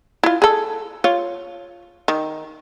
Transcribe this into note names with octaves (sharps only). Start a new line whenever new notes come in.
E4 F4
G#4 A4
F4 C#5
D#3